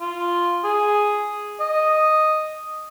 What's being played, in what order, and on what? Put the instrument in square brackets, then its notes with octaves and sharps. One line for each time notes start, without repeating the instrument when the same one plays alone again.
[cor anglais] F4
G#4
D#5